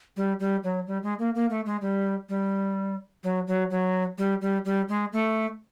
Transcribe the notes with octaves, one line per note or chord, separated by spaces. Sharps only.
G3
G3
F#3
G3
G#3
A#3
A#3
A3
G#3
G3
G3
F#3
F#3
F#3
G3
G3
G3
G#3
A3